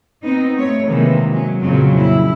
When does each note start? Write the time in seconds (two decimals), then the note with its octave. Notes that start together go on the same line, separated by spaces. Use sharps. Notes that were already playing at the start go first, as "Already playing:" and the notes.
0.22 B3 C4 D#4
0.56 A3 C#5
0.86 C3 D#3 E3 G#3 A#3
1.29 F#3 C#4
1.60 F2 A#2 C#3 F#3 C4
1.97 E4